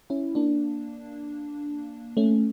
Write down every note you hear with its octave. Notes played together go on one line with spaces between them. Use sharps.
C#4 E4
A#3 D4
A3 C#4